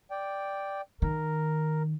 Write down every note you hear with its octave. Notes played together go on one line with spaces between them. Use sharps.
D5 G5
D#3 A#4